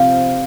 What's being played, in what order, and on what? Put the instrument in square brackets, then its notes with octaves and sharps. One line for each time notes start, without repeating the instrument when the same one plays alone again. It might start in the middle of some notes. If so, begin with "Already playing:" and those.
Already playing: [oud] C3 F3 [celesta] F5